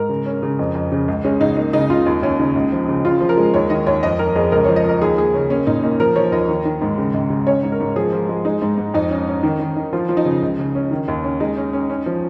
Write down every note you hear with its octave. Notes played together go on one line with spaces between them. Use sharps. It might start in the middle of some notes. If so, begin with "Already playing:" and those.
Already playing: G#2 A#4
C#3
C#4
C#3
F2
F2
C#3
C#2
G#3 C#4
C#2 D#4
A#3 D#4
C#3 D#4
C#2 F4
D#2
D#2 C#4
C#3 D#4
C#2
F3
C#3
C#3 F4
F3
A#4
G#3
D#2 C#5
D#3 D#5
D#2 C#5
F2 D#5
F2 A#4
F2 G#4
C#2 A#4
F3 C#5
D#5
F3 A#4
D#2 G#4
A#3 G#4
C#3 C#4
A#3 C#4
A#2 D#4
A#3 D#4
F3 A#4
F3 C#5
D#2 D#5
D#3
D#3
G#2
C#3
C#2
C#3
C#4 C#5
G#2
A#4
G#2
F3 G#4
F3
G#3
G#3 D#4
G#2
G#2
F2 D#4
C#4
C#4
D#3
D#3
D#3
F3 F4
F3
D#4
C#3
C#2
C#3
C#4
D#3
D#2
C#4
G#3 D#4
C#4
C#4
C#4
F3